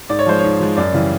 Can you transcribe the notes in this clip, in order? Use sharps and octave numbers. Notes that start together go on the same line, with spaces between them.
G#2 D5
C#5
F3 G#3 C5
G#2 C#5
F3 G#3
F#2 D5
C#3 E3 G3